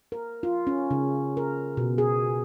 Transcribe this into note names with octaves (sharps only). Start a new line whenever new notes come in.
A#4
F4
C#4
C#3
A#4
B2
G#4